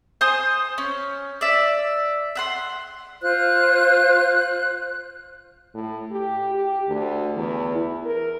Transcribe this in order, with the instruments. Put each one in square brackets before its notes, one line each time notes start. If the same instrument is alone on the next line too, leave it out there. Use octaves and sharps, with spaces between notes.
[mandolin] C5 G#5 C6 D#6
C#4
D5 E5
E5 F#5 C6
[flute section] F4 C5 F#6
[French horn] A2
G4
G4
D2
E2
E4
A#4